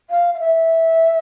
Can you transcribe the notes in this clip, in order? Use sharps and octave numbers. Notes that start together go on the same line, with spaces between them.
F5
F5
E5